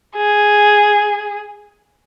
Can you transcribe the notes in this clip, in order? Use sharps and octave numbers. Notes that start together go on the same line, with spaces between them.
G#4